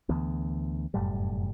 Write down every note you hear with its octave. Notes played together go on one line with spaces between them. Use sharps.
D2 E3 B3
F1 F#2 A2 G3